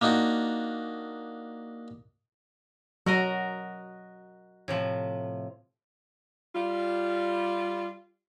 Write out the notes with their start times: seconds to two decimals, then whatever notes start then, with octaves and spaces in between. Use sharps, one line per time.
0.01 A#3 D4 D#4 F#4
3.06 F#3 F#4 A#4 D#5
4.68 A2 C3 F3
6.55 G3 F4